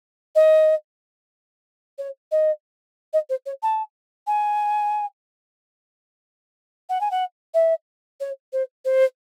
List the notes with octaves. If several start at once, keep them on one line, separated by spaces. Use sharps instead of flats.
D#5
C#5
D#5
D#5
C5
C#5
A5
G#5
F#5
G#5
F#5
E5
C#5
C5
C5